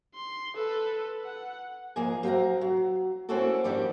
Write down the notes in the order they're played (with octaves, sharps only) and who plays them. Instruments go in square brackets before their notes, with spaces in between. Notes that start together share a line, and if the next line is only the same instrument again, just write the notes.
[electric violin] C6
A4 B4
F#5
[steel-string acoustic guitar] F3 A#3 G#4 D#5 G#5
F#3 C4 E5 F5 A#5
F#3
A#3 C4 C#4 E4 F#4 A4
D#3 F3 G3 F#4 G4